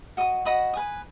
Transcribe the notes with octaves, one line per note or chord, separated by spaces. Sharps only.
F#4 D#5 B5 D#6
F#4 D#5 B5 D#6
B4 G#5 D#6